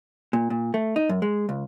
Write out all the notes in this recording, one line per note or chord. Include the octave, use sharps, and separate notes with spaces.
A#2
A#2
A3
D#4
F#2
G#3
C#2